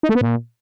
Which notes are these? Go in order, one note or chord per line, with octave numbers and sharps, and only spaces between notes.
D#4
A3
B3
A#2